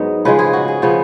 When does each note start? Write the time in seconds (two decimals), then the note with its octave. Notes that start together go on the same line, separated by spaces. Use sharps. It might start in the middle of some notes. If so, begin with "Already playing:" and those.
Already playing: G#2 F#3 B3 D#4
0.25 C#3 F3 G#3 B4
0.39 G#4
0.53 F#4
0.68 G#4
0.82 C#3 F3 B3